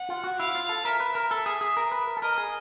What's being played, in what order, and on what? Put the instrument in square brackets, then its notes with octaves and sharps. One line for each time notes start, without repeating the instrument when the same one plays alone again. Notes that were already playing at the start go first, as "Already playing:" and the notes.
Already playing: [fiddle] F#5
[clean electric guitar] F4
F#4
[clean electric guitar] E4 [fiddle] F5
[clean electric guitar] F4
A4
[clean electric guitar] A#4 [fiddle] E5
[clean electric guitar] B4
A#4
A4
G#4
G#4
A#4
B4
A#4
A4
[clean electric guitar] A#4 [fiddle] D#5
[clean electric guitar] G#4